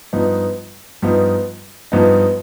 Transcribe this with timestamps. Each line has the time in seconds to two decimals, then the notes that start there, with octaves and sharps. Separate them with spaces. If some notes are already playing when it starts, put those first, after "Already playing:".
0.13 G2 F3 B3 D#4
1.02 G2 F3 B3 D#4
1.92 G2 F3 B3 D#4